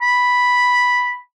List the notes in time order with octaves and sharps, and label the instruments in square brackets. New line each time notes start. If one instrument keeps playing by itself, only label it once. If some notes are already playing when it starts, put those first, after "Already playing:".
[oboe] B5